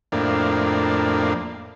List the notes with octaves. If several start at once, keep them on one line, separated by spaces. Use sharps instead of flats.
F2 A2 A#3 D4